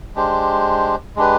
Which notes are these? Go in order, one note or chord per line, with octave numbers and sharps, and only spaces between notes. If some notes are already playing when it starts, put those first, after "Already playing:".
G#3 D4 G4 C5
G#3 D4 G4 B4